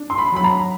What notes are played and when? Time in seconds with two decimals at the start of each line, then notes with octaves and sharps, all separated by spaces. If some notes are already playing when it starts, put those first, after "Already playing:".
Already playing: D4
0.10 C6
0.18 B5
0.32 F#3 B5
0.44 A#5